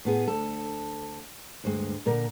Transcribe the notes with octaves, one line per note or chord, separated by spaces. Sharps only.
A2 B3 G#4
D2 A4
D2 G2 G#3
A#2 D3 A#4